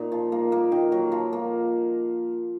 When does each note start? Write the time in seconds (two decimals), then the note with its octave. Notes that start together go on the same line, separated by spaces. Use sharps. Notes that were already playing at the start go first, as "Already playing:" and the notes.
Already playing: A#2 D#4
0.12 F3
0.32 A#3
0.52 A#3
0.72 D#3
0.92 F#3
1.12 F3
1.33 A#3